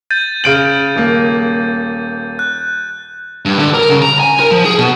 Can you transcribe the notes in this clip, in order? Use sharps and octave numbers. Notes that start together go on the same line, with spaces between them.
G6 A6 D#7
C#3 D7 F#7
D#1 A#3
F#6
G2
D3
A#4
C#3
A#5
G#5
A#4
F3
G#4
B2